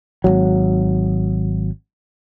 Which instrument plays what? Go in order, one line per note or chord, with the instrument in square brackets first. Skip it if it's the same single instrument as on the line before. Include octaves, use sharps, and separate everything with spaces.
[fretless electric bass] G#1 D#2 F#3